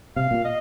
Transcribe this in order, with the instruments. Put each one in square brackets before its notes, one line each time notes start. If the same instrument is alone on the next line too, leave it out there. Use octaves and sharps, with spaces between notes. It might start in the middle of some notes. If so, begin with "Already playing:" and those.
[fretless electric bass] C3 [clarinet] F5
[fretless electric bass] A#2
[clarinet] D#5